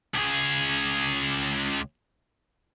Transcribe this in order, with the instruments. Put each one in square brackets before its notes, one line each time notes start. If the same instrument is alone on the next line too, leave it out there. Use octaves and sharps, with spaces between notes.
[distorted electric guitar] C#2 G#4